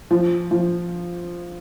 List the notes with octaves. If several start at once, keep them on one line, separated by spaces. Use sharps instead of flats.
F3
F3